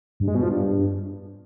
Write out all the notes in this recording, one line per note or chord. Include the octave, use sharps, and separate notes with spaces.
G2
G#3
B2
F3
G2